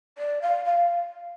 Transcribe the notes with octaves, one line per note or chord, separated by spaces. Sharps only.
D5
F5
F5